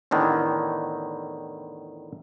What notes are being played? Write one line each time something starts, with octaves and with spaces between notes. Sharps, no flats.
E2 A2 D3 D#3